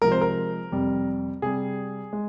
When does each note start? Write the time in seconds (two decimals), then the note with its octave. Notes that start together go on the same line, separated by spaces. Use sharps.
0.02 C3 F3 G#3 A#4
0.12 C5
0.21 A#4
0.72 F2 C3 G3
1.42 C3 G3 G#4
2.13 G#3